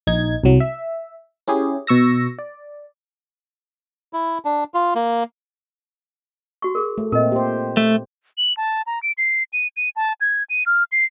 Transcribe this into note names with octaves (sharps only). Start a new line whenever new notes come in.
A#1 D#4 G#6
C2 F#3
E5
C#4 E4 G4 G#4
B2 C#6 E6 A#6
D5
E4
D4
F4
A#3
F#4 C#6
G#4 A#4
A3
A#2 C4 A#4 D#5
G4 C5
A3
F#7
A5
A#5
D7
C7
D#7
D#7
A5
G#6
D#7
F6
C7